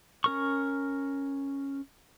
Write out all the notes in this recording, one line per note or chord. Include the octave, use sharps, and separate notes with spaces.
C#4 A#4 C#6